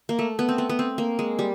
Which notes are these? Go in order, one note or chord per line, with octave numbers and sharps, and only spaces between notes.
A#3
A3
B3
C4
B3
B3
C4
A#3
G#3
G3